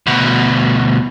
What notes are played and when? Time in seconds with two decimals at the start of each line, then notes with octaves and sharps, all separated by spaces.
0.07 D2 B2